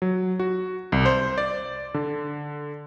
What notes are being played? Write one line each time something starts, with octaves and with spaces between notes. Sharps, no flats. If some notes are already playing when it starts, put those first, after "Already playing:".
F#3
F#4
C2
C5
D5
D3